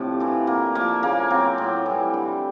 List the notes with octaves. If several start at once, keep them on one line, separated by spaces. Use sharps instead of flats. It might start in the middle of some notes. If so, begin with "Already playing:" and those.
Already playing: A2 C3 F3 D4
E3 A3
D3 A#3
F3 A3 A#3
C#3 A#3
F#3 A3 C4
A2
E3 G3
D3